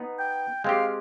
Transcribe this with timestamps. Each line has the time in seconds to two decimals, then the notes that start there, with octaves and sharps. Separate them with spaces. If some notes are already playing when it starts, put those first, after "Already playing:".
Already playing: B3 D#4 B4
0.19 G5
0.64 G#3 C4 G4 F5